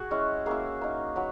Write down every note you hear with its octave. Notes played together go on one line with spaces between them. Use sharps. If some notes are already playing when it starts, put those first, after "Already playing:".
Already playing: F#4 G#4
G#3 C#4 E4
A#3 C#4 E4 G#4
A#3 D#4
F#3 B4